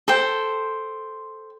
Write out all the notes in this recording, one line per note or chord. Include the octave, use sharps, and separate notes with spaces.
A4 C5 G5